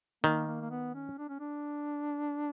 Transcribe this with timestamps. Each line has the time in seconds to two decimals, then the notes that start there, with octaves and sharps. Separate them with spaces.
0.24 D#3 A#3
0.47 A#3
0.61 A#3
0.71 B3
0.94 C#4
1.18 D4
1.29 C#4
1.40 D4